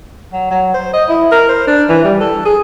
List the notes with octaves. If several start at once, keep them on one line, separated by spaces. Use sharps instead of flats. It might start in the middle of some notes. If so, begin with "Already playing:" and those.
F#3
F#3
C5
D#5
E4
A#4
C5
D4
E3
G3
A4
G#4